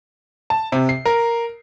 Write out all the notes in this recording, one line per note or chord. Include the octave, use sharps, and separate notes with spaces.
A5
C3
C7
A#4